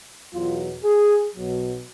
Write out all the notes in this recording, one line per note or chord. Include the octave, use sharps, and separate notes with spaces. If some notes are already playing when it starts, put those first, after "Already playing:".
E2 B2 F#3 F4
G#4
B1 B2 F#3